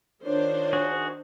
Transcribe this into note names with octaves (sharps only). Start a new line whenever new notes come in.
D#3 D4 F4 A#4 C5 C#5
F#4 G#4